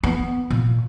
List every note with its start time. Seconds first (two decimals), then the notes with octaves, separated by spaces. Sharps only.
0.03 B3
0.50 A#2